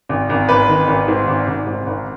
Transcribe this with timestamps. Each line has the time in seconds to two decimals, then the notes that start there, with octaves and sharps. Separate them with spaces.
0.09 G#1
0.30 G#1
0.49 G#1 B4
0.69 D#3
0.88 G#1
1.08 G#2
1.27 G#1
1.47 G#1
1.67 G#2
1.87 G#1